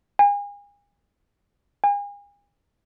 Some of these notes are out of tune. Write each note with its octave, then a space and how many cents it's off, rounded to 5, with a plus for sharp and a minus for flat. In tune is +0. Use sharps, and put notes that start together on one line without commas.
G#5 -35
G#5 -40